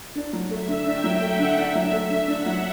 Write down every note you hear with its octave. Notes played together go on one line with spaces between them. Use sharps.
D4
F#3
A3 E5
D3
D4 G5
F#3
A3 F#5
D3
D4 E5
F#3
A3
D3
D4 F#5
F#3